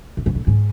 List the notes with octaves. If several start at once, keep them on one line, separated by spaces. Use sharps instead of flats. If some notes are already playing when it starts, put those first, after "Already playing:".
A2
G#2
A2
G#2